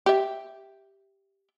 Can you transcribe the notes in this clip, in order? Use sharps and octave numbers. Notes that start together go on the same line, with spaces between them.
G4 E5